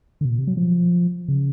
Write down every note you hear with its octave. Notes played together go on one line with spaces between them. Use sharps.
D3
B2
A#2
C3
F#3
F3
C#3